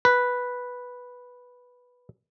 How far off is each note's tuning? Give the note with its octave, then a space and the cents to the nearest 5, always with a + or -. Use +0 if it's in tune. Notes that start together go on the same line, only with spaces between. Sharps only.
B4 -5